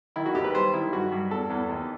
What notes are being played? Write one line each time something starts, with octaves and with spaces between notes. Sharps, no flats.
D#3 E4
F#4
D#2 G4
B4
G3 C5
D#3 E4
G2 F#4
G2
E2 A4
E2
D#2